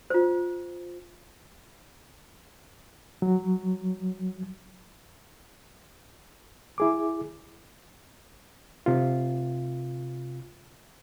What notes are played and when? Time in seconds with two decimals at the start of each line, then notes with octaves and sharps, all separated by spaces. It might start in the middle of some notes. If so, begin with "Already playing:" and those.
0.10 F4 C5
3.22 F#3
6.78 E4 G#4 D6
8.86 C3 F4